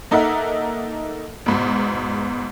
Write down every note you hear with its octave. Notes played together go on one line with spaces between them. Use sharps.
A#3 D#4 A4 A#4 E5 F#5
E2 G#2 B2